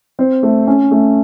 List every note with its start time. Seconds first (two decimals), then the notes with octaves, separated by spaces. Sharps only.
0.19 C4
0.43 A3
0.67 C#4
0.91 A3